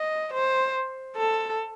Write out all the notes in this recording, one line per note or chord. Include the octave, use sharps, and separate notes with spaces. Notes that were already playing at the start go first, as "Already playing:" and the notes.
Already playing: D#5
C5
A4